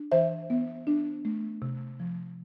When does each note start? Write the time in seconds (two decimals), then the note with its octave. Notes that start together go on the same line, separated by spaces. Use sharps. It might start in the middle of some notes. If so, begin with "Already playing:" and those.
Already playing: D4
0.12 E3 C5 E5
0.50 B3
0.87 D4
1.25 A3
1.62 C3
2.00 F3